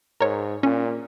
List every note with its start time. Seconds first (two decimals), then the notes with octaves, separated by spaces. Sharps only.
0.20 G#2 A#4 C#5
0.63 A#2 C#4